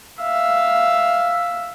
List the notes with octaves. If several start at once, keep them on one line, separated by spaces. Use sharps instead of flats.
E5 F5